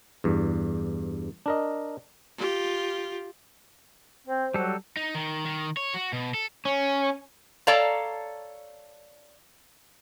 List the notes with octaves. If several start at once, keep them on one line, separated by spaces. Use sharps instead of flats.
E2 G2
D4 A#4 D#5
F4 G4
C4 C5
F#3 G3 A4
D#4
D#3
D#3
C#5
F#4
B2
A4
C#4
A4 C#5 D5 F5 A5 A#5